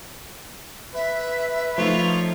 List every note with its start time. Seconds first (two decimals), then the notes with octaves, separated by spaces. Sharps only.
0.95 B4 E5
1.78 F3 A3 D#4 F4 C#5